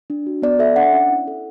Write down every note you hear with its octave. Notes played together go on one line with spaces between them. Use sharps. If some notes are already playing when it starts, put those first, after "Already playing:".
D4
F#4
B3 D5
A4 E5
D4 F#5
C#4
E4
A4